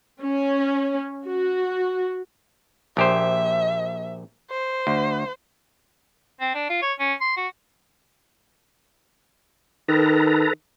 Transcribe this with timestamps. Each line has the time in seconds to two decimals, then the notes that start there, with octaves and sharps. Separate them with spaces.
0.21 C#4
1.25 F#4
2.97 A#1 G4 C5 E5
4.50 C5
4.87 D2
6.40 C4
6.54 D4
6.70 F4
6.82 C#5
7.00 C#4
7.21 C6
7.37 F#4
9.88 D#3 A4 B4 A#5